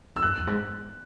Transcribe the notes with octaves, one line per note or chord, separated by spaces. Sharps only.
G#2 E6
F#2 F#6
E2
G#2